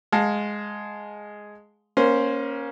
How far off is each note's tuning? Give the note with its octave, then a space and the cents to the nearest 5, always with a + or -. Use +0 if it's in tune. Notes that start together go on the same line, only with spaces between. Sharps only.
G#3 +0 F5 +30 A5 +0
A#3 +25 C#4 +0 C5 +0